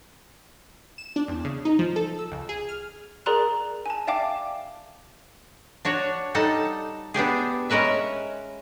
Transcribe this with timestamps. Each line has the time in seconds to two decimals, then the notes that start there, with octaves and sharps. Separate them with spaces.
0.98 E7
1.16 D4
1.28 E2
1.45 C#3
1.65 D#4
1.79 F3
1.96 A4
2.19 E6
2.32 C#2
2.49 G#4
2.69 F6
3.26 G#4 A#4 D5 A#5 C6 F#6
3.86 G#5 A5
4.07 D5 E5 F5 G5 A5 D6
5.85 D4 F#4 C#5
6.35 G3 D#4 A4 F#5
7.14 B3 D4 G4 G#4
7.70 G#3 C#4 A#4 B4 E5